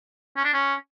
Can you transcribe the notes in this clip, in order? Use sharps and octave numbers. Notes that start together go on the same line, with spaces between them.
C#4
D4
C#4